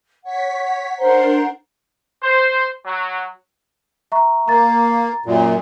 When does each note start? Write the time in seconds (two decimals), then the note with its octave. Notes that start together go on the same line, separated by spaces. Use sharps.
0.24 C#5 F#5 B6
0.98 D4 A#4 C5 F#5 A#5 C6
2.23 C5
2.85 F#3
4.12 E5 A#5 C#6
4.48 A#3 A#5 A6
5.26 F#2 A#2